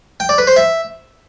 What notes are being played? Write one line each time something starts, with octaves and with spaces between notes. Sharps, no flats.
G5
D5
B4
C5
E5